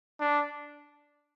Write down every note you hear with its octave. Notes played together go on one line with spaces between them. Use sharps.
D4